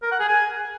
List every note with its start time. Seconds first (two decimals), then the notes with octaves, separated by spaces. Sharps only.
0.03 A#4
0.11 F#5
0.20 G#4
0.28 G#5